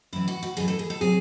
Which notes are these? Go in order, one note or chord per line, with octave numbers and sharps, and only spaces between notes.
F#2 E3 E4
F#4
F#4
F#2 E3 G#4
A4
G#4
A4
C3 F#3 G#4